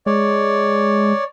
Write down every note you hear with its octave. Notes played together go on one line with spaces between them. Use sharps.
G#3 C#5 D5